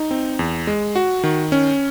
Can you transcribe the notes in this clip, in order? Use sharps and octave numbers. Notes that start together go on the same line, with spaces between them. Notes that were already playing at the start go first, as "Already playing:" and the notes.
Already playing: D#4
C4
E2
G#3
F#4
D#3
C#4